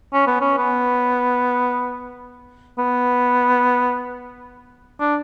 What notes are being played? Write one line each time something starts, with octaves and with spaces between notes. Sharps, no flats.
C#4
B3
C#4
B3
B3
D4